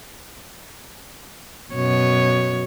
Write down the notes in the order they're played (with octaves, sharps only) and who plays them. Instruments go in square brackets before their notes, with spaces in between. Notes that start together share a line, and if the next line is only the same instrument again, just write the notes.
[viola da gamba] F#2 B2 C#5